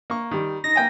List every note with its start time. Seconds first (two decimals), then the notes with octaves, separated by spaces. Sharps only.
0.10 A#3 C#6
0.31 D#3 G3
0.64 D#4 A#6
0.76 A#3 G5 G#5